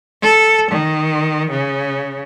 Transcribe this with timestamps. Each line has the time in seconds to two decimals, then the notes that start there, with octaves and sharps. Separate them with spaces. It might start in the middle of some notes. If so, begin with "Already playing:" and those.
0.22 A4
0.71 D#3
1.50 C#3